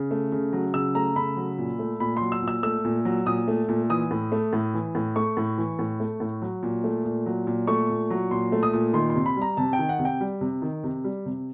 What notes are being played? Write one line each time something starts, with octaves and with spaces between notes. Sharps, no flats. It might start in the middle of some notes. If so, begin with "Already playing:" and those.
Already playing: C#3
A3
C#3
F#3
C#3 E6
A3 A#5
C#3 B5
F#3
A#2
A3
A#2 B5
F#3 C6
E6
A#2
E6
A3 E6
A#2
F#3
A#2 D#6
A3
A#2
E3 D#6
A2
A3
A2
E3
A2
A3 C#6
A2
E3
A2
A3
A2
F#3
A#2
A3
A#2
F#3
A#2
A3 C#6
A#2
F#3
A#2 C6
A3
D#6
A#2
D#3 C6
C6
C3
B5
G3 A#5
C3 A5
G5
D#3
F#5
C3
G5
G3
C3
D#3
C3
G3
C3